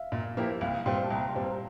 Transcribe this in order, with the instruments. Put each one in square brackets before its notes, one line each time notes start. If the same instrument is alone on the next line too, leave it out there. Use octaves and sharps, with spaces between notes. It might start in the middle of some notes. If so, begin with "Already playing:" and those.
Already playing: [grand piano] E5 F5
[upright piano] A#2
F3 A#3 E4 G4
[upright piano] C2 [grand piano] F5
[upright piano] A#2 G3 C4 [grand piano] G5
[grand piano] A5
[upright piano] C2 [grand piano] A#5
[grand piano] C6
[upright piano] A#2 G3 C4
[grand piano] A#5